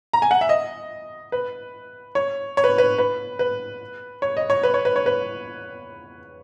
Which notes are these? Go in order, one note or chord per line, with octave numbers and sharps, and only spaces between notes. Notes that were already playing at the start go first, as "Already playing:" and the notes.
A#5
G#5
F#5
E5
D#5
B4
C#5
C#5
B4
B4
B4
B4
C#5
D#5
C#5
B4
C#5
B4
C#5
B4